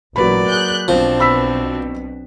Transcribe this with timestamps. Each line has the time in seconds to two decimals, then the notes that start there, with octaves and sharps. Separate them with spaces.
0.16 A1 A#2 F#3 A#3 B4 D5 B5
0.48 G#4 F#6 G6
0.88 B1 B2 F3 C4 D4
1.20 B5 E6 B6